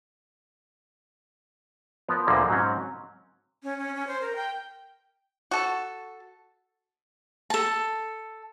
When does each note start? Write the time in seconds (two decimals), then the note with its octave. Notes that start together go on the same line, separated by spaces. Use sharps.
2.08 F3 B3 A#4
2.27 D2 A#2 D3 F3 G3 A#3
2.49 G#2 F#3 C4 C#4
3.63 C#4
3.78 C#4
3.95 C#4
4.07 C5
4.21 A#4
4.36 G5
5.51 F#4 A4
7.50 A4 A5